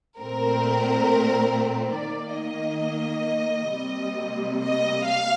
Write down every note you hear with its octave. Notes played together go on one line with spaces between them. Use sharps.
A#2 A3 C4 A#4
D#3 A#3 D5
D#5
C3 G3 A#3
D#5
F5